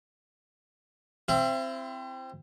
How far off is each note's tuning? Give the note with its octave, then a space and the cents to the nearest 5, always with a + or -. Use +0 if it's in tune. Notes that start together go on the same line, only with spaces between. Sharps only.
C4 +0 E4 +40